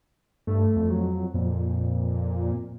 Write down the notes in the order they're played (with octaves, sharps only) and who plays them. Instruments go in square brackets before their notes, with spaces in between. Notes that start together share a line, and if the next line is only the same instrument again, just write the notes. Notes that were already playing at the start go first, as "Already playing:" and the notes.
[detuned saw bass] G2 [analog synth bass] A3
[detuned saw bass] F2
[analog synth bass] F#3
[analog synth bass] F2 [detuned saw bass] A#2